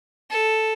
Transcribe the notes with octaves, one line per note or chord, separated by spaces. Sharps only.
A4